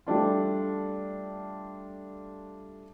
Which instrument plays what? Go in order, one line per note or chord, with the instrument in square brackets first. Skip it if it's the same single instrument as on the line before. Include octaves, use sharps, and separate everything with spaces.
[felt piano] G3 A3 D4 F4